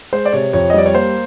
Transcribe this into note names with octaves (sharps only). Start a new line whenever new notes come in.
G#3 C5
D5
C3 C#5
F2 C#5
D#5
G3 D5
C#5
A#3 C5